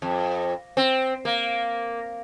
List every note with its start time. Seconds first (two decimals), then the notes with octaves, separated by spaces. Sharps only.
0.02 F2
0.77 C4
1.25 A#3